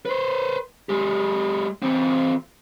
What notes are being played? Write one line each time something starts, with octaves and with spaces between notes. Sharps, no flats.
B4 C5
G#3 G4
E3 C4